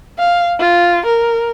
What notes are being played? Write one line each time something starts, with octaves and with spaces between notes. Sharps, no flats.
F5
F4
A#4